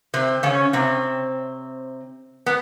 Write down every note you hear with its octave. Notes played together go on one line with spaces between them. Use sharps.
C3 C4
C#3 C#4
C3 C4
B3